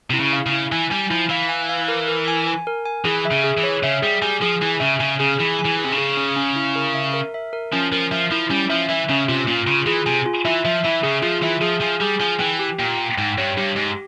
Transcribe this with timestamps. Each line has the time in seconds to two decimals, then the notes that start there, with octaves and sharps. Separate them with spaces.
0.10 C3 E4
0.20 C#3
0.33 F5
0.46 C#3
0.52 E4
0.72 E3 G#5
0.91 G3 G#5
1.10 F3 E4
1.30 E3 F5
1.49 G#5
1.69 F5
1.88 A#4
2.08 A#4
2.28 G#5
2.47 G#5
2.67 A#4
2.85 G#5
3.05 E3 G#4
3.25 E5
3.31 C#3
3.44 G#4
3.57 E3
3.63 C#5
3.83 C#3 E5
4.02 G3 G#4
4.22 G3 G#5
4.41 F3 G#4
4.61 E3 G#5
4.80 C#3 E5
5.00 C#3 G#5
5.19 C#3 G#4
5.38 E3 G#4
5.59 G#5
5.65 E3
5.78 G#4
5.84 C3
5.91 C#3
5.98 G#4
6.17 C#4
6.36 C#4
6.56 E4
6.76 A#4
6.94 E5
7.14 A#4
7.34 E5
7.53 A#4
7.73 F3 C#4
7.92 F3 A#4
8.11 F3 E5
8.31 F3 E4
8.50 G3 C#4
8.70 F3 E5
8.89 E3 E5
9.09 C#3 C#4
9.28 C3 F4
9.47 A#2 F4
9.67 C#3 F4
9.86 E3 G#4
10.06 C3 G#5
10.26 F4
10.45 E3 E5
10.65 F3 E5
10.84 E3 E5
11.03 C#3 G#4
11.22 F3 F4
11.42 E3 E5
11.61 F3 G#4
11.81 F3 G#5
12.01 G3 G#4
12.20 F3 G#5
12.39 E3 G5
12.59 G4
12.79 A#2 G5
12.98 G5
13.18 G#2 G5
13.38 G2 C#5
13.57 G2 G4
13.76 G#2 G4